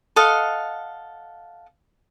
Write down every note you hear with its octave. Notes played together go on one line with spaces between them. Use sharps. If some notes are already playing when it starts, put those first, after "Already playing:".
A4 D#5 F5 F#5